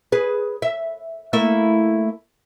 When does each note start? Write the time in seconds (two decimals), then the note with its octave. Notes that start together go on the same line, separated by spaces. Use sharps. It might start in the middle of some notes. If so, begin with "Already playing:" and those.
0.12 G#4 B4
0.62 E5
1.33 A3 A#3 E4